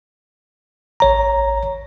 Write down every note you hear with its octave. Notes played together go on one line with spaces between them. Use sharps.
A1 C#5 A#5